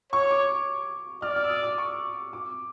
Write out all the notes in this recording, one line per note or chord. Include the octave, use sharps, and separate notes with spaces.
C#5 C#6
D6
D5 F6
F6
E6
D#6
D6
C#6
D6